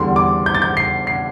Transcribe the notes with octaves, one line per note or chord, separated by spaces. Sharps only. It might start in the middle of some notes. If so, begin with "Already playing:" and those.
Already playing: E2 D3 G3 C6
D6
G6
A6
G6
C7
C7